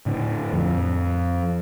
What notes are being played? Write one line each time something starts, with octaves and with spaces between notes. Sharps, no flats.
A2 D3
F2